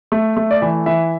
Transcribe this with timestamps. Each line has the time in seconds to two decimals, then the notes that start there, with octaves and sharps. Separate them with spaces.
0.12 A3
0.37 A3
0.51 D5
0.61 E3 E5
0.86 E3 E5